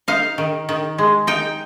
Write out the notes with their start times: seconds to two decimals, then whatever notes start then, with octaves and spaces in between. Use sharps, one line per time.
0.08 D#4 F5
0.38 D#3
0.69 D#3
0.98 G#3
1.27 D#4 G5